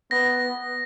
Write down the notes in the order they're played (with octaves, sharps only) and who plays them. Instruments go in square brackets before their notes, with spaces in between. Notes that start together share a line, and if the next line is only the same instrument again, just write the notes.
[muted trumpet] B3 [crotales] A#6